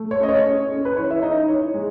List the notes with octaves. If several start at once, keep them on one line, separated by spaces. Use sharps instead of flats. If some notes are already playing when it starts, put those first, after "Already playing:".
Already playing: A3
C#5
C#4 D#5
C#5
C#4
C#4
B4
E3 C#5
E5
D#4 D#5
E3 C#5
G#3